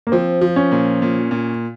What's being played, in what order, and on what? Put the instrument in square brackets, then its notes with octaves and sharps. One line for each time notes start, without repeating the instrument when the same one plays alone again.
[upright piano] A#3
[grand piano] F3 [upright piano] C4
[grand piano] F3
[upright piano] C#4
[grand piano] A#2
A#2
A#2